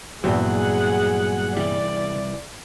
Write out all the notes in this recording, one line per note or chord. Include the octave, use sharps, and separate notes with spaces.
E2 G2 A#2 F#3 G3 C4 G#4 F#5
C2 E3 G3 D5